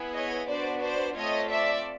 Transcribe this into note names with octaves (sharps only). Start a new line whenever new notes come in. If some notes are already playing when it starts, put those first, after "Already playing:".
Already playing: B3 E4 G#4
C#5 D#5
B3 D4 F#4 C5 D5
C5 D5
A3 C4 F4 A4 C#5 D#5
D5 E5